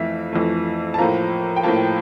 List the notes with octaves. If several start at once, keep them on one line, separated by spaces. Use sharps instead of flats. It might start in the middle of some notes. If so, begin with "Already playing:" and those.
Already playing: F2 E3 A3 E5 F5
F2 E3 A3
A5
A2 F3 A#3 A#5
G5
A2 F3 A#3 A5